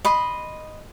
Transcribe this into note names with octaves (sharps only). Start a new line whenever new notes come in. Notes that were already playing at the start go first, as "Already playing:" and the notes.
D#5 B5 C6